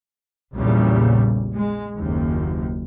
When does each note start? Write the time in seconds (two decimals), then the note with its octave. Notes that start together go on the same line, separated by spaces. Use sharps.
0.55 A#1 E2 A#2 C#3 G3
1.52 G#3
1.97 F#1 D#2